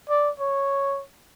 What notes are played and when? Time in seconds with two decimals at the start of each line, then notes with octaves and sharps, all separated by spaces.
0.10 D5
0.40 C#5